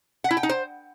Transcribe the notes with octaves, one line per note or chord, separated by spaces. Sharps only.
F#5
E4
G5
D#4
C5